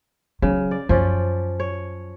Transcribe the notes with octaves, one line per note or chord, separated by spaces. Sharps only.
C#3 F#3
D5
F#2 F3 C#4 D5
C#5